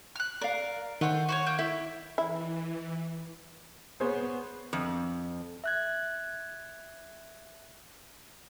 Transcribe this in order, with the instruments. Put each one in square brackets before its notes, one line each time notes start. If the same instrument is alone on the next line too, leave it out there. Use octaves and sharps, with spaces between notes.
[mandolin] F6 F#6
[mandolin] A#4 [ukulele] D5 F5
[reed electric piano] D#3 F#5 [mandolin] A3 C5
[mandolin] F#4 C5 C#5
A#3 G6
[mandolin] E4 [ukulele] E5
[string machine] E3 [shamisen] E4
[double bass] B3 [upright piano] G#4 C5 C#5
[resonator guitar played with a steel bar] F2
[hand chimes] E5 F#6 G#6